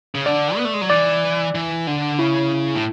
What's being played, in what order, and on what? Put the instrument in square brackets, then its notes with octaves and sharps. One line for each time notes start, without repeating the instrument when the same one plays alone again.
[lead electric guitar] C#3
[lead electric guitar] D3 [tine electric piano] D5
[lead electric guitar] B3
A3
G#3
F#3
[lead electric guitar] E3 [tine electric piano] D5
[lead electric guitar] E3
D3
[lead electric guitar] C#3 [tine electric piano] E4
[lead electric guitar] A2